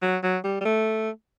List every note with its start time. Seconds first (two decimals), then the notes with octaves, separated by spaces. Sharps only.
0.02 F#3
0.23 F#3
0.44 G3
0.61 G3
0.65 A3